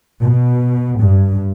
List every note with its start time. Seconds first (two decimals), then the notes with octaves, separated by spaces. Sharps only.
0.21 B2
0.99 G2